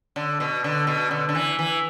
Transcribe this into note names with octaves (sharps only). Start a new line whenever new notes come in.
D3
B2
D3
B2
D3
D3
E3
E3